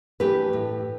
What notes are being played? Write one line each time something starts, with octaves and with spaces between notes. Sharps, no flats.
E3 A3 D4 G4 B4
A2